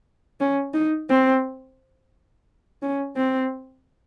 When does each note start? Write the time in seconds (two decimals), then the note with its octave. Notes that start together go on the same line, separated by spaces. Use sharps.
0.40 C#4
0.74 D#4
1.10 C4
2.82 C#4
3.17 C4